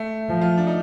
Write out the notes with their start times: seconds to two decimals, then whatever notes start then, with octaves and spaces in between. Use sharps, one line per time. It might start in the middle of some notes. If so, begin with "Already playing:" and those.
Already playing: A3
0.29 F3
0.41 F4
0.58 D4
0.67 D#4